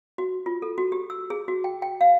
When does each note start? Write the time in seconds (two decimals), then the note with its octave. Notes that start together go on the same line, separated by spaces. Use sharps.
0.18 F#4
0.46 F4
0.62 A4
0.78 F#4
0.92 G4
1.10 E6
1.30 G#4
1.48 F#4
1.64 G5
1.82 G5
2.01 F5